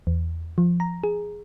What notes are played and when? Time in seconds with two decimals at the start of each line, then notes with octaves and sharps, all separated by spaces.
0.07 E2
0.58 F3
0.80 A#5
1.04 G#4